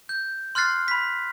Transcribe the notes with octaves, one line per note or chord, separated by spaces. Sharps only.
G6
C6 F6 F#6 A6 C7
B5 B6